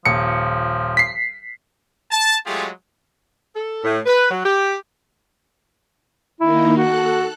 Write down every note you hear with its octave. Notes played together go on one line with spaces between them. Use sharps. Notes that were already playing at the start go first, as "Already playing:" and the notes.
D#1 F3 C#7
B6 C7
A5
F#3 G#3 A3 F4 G4 G#4
A4
A2
B4
F#3
G4
D#3 A#3 D#4 E4
F#4 A4 F#6